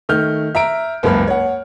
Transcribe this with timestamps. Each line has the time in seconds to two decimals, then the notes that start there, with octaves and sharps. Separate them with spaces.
0.09 D#3 A3 F6 G6
0.55 E5 A#5 D7
1.03 F#1 C#2 F#2 A#3 B5 F6
1.27 C#5 F#5